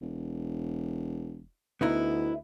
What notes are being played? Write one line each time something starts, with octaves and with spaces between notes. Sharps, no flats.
E1
D2 B3 D#4 E4